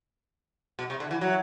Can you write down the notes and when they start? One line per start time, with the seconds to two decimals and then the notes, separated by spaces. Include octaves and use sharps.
0.79 B2
0.90 C3
1.00 D3
1.11 E3
1.21 F#3